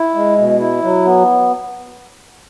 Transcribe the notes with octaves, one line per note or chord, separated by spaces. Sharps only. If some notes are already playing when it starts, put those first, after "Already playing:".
Already playing: E4
G#3
B2
E4
F#3
B3